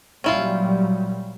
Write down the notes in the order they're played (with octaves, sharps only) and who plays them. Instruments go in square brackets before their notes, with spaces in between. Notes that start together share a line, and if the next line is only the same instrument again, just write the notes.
[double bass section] A#2 F#3 G3 [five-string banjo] C#4 E4 F4